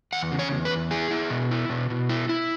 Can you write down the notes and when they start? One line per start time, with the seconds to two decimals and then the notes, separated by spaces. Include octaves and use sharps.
0.13 E2 F#5
0.32 C#3
0.39 C#5
0.51 E2
0.65 B4
0.71 E2
0.91 E4 G#4
1.11 E4
1.30 B2
1.51 E4
1.70 B2
1.90 B2
2.09 E4
2.29 E4